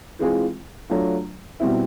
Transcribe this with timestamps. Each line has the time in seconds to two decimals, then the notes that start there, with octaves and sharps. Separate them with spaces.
0.19 E3 G#3 C4 F4 G#4
0.90 F#3 A3 D4 F4
1.60 B2 G3 C4 E4